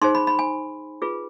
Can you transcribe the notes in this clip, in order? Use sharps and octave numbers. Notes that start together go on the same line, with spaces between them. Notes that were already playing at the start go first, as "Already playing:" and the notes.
D#4 G#4 C5 C6
B5
B5
G#5
F4 G#4 B4